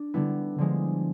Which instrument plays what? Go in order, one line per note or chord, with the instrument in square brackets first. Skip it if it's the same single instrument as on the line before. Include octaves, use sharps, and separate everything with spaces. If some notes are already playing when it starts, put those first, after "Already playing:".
Already playing: [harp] D4
D3 G3 B3 E4
D3 F3 G#3